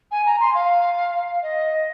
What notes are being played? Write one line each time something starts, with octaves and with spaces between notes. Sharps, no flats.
G#5
A#5
C6
F5
D#5